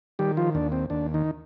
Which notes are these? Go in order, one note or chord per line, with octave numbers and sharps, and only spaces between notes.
D#3 G3 G4
F3 F4
D#2 D4
C4
D#2 D4
D#3 D#4